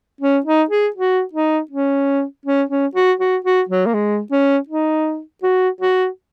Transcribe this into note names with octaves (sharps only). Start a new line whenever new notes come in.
C#4
D#4
G#4
F#4
D#4
C#4
C#4
C#4
F#4
F#4
F#4
F#3
A#3
G#3
C#4
D#4
F#4
F#4